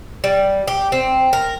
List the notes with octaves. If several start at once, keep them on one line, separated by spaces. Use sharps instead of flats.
G3
G4
C4
A#4